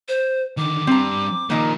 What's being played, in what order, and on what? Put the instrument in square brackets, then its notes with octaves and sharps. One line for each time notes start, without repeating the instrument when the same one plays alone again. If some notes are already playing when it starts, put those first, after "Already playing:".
[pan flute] C5
[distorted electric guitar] D3 D#3 [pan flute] D6
[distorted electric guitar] G3 D4 [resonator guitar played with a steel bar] C4 A#5
[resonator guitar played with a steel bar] A#2 D#3 A#4 [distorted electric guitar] F3 A#3